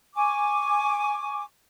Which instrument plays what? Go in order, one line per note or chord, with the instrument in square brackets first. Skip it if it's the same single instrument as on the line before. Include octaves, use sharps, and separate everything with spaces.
[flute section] G#5 C#6 D6